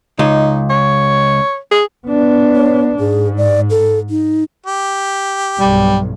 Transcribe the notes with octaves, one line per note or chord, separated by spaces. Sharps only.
C#2 D#4
C#5
G#4
B3 D4
C#5
G#2 G#4
D5
A4
D#4
G4
B1 G2 G3